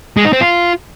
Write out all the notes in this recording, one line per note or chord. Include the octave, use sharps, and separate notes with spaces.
G#3
D#4
C4
F4